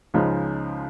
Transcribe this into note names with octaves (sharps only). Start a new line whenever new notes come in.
C#2 C#3 F3 G#3 D#4